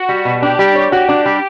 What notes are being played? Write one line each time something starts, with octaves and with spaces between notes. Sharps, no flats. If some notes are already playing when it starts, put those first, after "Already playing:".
Already playing: F#4
G3
B2
D4 G4
G3
C#5
F#4 G4
D4
G3